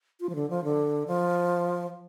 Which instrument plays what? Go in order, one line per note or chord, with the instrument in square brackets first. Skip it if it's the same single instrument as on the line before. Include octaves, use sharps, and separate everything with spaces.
[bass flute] F4
F3
D3
F3
D3
F3